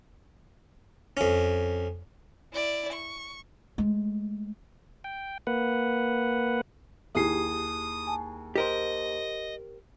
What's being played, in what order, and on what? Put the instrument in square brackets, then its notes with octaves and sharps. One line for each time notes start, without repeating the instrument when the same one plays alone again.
[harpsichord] F2 C#4
[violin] E4 D5
C#6
[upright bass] G#3 A3
[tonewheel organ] G5
A#3 B4 F#5
[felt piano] D#2 G#4 C7 [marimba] E4 G4 [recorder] D#6
[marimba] G#5 A5
[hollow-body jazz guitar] G4 A#4 C5 [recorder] D#5